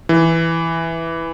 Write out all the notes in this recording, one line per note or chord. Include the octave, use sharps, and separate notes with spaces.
E3